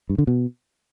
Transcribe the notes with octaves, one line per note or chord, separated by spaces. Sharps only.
G2
D3
B2